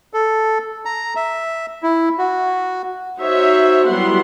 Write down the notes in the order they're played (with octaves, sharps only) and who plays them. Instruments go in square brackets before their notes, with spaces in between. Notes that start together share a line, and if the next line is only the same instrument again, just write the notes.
[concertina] A4
A#5
E5
E4
F#4
[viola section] D#4 F#4 C5 C#5 E5
F#3 G3 B3 E4 F#5 C6